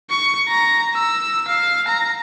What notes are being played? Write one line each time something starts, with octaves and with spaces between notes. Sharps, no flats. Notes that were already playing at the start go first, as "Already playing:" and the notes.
C#6
A#5
E6
F5
A#5